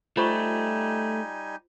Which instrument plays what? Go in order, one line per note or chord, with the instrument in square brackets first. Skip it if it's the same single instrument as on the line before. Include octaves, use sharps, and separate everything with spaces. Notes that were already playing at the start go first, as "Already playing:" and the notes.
[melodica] G3 D#4 G#5 [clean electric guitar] A3 [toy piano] F4 C5 C#6